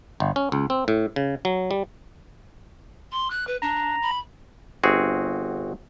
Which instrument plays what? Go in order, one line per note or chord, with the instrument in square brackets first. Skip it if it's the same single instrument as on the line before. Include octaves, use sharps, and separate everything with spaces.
[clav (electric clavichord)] G1
C#4
C#2
C4
A2
C#3
F#3
G3
[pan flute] C6
F#6
B4
[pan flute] D4 [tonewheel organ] A#5
[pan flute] B5
[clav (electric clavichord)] G1 C4 F#4 G#4